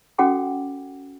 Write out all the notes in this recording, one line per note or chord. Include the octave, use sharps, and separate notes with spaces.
C#4 F#4 A4 F#5 G5 D6